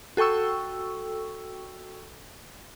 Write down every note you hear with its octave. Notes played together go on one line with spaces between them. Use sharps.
F#4 A4 G5 C#6 E6